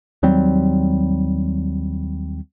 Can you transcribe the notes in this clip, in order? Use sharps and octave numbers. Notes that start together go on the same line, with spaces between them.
D#2 F#3 G3 C4